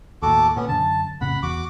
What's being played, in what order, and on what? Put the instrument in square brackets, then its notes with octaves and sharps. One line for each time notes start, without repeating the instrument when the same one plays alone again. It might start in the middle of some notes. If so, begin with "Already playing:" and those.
[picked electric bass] D#2 A2 [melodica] F#4 A4 D6
[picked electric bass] A#2 [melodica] B3 C#4
[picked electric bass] F#2 D3 [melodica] A5
[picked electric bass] F1 A2 C#3 [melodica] F#5 B5
[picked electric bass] E2 [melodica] F#4 D6